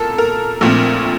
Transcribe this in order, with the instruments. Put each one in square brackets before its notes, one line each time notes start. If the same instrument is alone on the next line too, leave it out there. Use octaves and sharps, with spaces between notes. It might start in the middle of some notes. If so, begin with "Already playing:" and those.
Already playing: [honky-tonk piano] A#2 A4 A#4
A#4
A#1 A#2 A3 C4